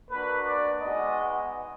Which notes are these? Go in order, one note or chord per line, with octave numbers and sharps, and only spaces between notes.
A#3 D4 F#4 B4
D5
G#3 B3 D#4 F#4 D#5